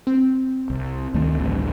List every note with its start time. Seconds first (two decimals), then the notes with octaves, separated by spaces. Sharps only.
0.07 C4
0.70 C2
1.14 D2 D#3 A3
1.39 A1 D2 G2